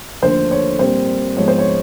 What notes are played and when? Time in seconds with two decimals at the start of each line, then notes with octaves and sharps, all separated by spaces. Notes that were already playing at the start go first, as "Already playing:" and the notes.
0.22 D#2 D3 F3 A3 C5
0.51 C#5
0.79 A#2 G3 C4 C5
1.37 G#2 F3 G#3 B3 C#5
1.48 C5
1.59 C#5